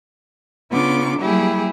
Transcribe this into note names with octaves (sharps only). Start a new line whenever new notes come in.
C#3 B3 D4 F4 D6
F#3 G3 A#3 E4 G4 G#4